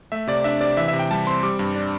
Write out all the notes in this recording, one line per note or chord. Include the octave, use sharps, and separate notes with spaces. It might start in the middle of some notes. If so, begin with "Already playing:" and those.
A3 E5
C3 D5
D4 E5
C3 D5
E3 E5
E5
C3
G5
G3 A5
C4 C6
G3 D6
G2
D4